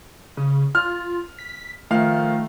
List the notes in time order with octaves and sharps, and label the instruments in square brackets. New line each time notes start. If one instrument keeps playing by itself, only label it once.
[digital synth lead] C#3
[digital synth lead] F4 [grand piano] F6
[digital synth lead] B6
[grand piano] D#3 F3 F5 [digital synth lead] A3